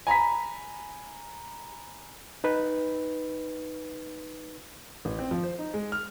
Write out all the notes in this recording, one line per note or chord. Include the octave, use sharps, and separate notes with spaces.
G#5 A#5 B5 B6
D#4 B4
A1
C4
F3
C5
D#4
G#3
F6